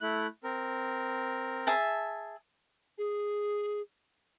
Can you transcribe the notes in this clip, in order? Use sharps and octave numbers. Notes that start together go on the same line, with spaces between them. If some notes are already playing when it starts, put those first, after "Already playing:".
A3 E4 F#6
C4 A#4
G#4 E5 A5
G#4